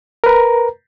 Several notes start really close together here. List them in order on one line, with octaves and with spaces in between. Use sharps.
A#4 B4 A#5